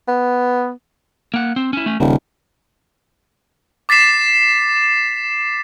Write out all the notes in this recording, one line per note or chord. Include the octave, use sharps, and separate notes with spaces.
B3
A#3 F#5
C4
C#4 E4
A3 C#4
D#1 C#3
D6 A6 B6 C7 E7